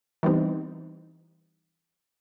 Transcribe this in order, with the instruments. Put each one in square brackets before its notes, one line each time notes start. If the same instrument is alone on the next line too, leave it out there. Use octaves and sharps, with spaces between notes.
[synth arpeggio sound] E3 G3 B3 C4 D#4